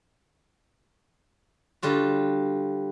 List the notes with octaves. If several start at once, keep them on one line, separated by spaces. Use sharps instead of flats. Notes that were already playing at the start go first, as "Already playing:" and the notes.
D3 G3 F4 F#4